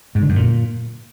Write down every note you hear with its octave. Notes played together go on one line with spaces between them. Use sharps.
G#2
D3
F#2
A#2